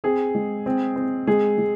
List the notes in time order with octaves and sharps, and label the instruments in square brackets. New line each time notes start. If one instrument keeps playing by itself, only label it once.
[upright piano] C4 [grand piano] G#4
[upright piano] G#3
C4
C4
[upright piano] G#3 [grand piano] G#4
[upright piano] G#3